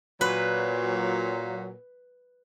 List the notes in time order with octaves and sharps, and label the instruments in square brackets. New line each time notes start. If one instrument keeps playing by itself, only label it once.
[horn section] A#2 F#3 [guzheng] B4